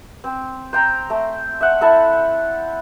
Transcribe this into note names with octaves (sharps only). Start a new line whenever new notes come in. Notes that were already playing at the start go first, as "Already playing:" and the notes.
C4
C5 G5 A#5
A3
E5 F#5
E4 A4 E5